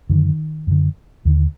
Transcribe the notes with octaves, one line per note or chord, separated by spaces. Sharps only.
F#2 D3 D#3
F#2 D3
D#2 D3